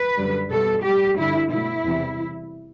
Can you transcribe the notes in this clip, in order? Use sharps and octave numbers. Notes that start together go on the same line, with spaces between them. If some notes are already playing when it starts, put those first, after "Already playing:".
Already playing: B4
F#2 D3 G3
B2 G3 A4
A2 G3 G4
G2 D3 G3 E4
B2 F#3 A3 E4
E2 C3 E3 G3